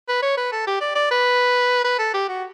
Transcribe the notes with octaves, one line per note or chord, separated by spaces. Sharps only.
B4
C#5
B4
A4
G4
D5
D5
B4
B4
A4
G4
F#4